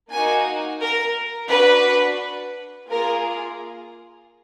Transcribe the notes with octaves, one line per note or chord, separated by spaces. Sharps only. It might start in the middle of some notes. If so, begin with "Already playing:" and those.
A#3 D#4 F#4 G#5
A#4
D4 F#4 B4
A#3 F4 G#4 A#4